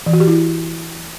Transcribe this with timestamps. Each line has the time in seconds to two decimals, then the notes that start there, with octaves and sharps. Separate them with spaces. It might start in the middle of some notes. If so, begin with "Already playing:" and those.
0.06 E3
0.13 F#4
0.20 G4
0.27 E4